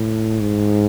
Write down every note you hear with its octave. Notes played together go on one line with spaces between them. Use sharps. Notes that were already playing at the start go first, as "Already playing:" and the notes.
Already playing: A2
G#2